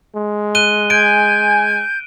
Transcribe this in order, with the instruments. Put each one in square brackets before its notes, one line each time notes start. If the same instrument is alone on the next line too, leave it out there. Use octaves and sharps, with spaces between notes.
[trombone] G#3
[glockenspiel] F#6 D#7 G7
[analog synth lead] G#5 [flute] G6 [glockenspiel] D7